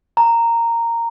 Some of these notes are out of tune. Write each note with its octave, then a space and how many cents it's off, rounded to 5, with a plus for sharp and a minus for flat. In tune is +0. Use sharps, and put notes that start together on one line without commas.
A#5 -10